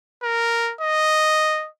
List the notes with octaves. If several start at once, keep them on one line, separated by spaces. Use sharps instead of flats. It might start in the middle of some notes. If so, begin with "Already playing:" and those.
A#4
D#5